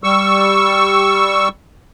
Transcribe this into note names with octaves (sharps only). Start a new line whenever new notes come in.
G3 C#6 E6